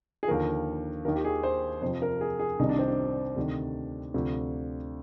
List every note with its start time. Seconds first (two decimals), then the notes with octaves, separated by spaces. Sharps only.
0.23 G#4
0.27 D#2 D3 F3 A#4
1.05 D#2 A#4
1.08 D#3
1.15 G4
1.25 G#4
1.43 C5
1.82 F2 C5
1.84 C3 F3
2.02 A#4
2.21 G#4
2.39 G#4
2.59 C2 C3 D#3 D#4
2.69 D4
2.79 C4
2.88 D4
3.36 D2 C3 D#3
4.14 D2 C3 F3